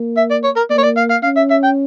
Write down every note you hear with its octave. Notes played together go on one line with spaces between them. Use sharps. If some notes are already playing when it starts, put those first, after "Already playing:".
Already playing: A#3
E5
D5
C#5
A#4
A#3 D5
C#5
D5
F5
F5
C#4 F5
E5
E5
G5